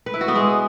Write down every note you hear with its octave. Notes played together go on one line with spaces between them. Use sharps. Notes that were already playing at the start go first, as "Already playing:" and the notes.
B4
E4
F#4
B3
G#3